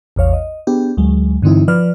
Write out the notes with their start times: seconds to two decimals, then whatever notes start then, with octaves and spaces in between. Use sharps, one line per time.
0.16 A1 E2 C#5 F5
0.33 D#5
0.67 B3 D4 G4 G#4
0.97 D2 F#3 G#3
1.42 G2 D3 E3 C4 D#4 E4
1.68 F3 B4 D5 F6